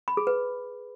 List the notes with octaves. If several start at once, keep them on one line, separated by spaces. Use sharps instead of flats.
B5
G#4
B4